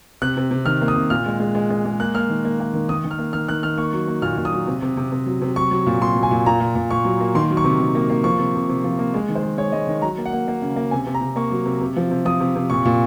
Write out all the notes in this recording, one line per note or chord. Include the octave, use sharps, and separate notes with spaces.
C3 F#6
C3
C3
D#3 F6
A#3
D#6
C3
A#2 F6
G#3
G#3
G#3
G#3
G#3
A#3 F#6
A#3 F6
D#3
A#3
A#3
D#3
D#3 D#6
D#3
F6
A#3
D#3 F6
D#3 F#6
D#3 F6
A#3 C#6
F#3
A#3
A#2 F6
A#2
D#6
F#3
C3
C3
C3
C3
F#3
C3
F#3 C#6
F#3
A#2
F#3 C6
F#3
G#5
A#2
A#2 A#5
A#2
A#2
A#2 C#6
F#3
A#3
D#3 C6
F#3
C#6
C3
D#3
A#3
A#3
F3 C#6
C3
C3
C3
F3
A#3
G#3
D#3
C5
G#3
G#3 C#5
G#3 D#5
D#3
F#3 A#5
A#3
F#5
A#3
A#3
C#3
A#3
C3 G#5
C3
A#5
C3
A#3 C#6
F#3
C3
C3
F3
C3
F3 D#6
C3
C3
A#2 C#6
A#2